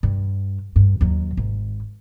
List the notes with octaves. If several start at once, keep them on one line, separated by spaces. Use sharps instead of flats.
G2
G2
D#2 F#3
G#1